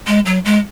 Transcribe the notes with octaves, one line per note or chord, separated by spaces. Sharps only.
G#3
F#3
G#3